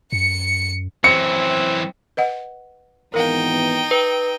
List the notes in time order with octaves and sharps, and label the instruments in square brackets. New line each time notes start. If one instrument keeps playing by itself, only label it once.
[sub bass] F#2 [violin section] C#7
[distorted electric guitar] F#2 E3 [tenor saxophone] C4 [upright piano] C#7
[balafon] B4 D#5 F#5
[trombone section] G#1 E3 B3 [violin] D#4 G5 [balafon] A#4 F5
[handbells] B4